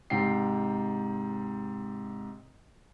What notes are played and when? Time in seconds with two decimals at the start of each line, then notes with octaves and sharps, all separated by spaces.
0.10 G#2 C3 G5 C7